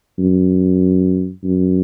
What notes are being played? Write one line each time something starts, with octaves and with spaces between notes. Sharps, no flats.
F#2
F#2